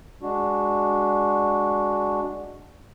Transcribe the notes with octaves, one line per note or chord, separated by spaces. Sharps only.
G#3 D4 F#4